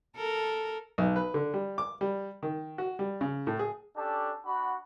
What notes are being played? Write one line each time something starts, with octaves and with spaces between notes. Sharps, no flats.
A4 A#4
B1
B4
D3
G3
D6
G3
D#3
F#4
G3
C#3
A2
G#4
C#4 D4 G4 A4
D4 F#4 F#5 B5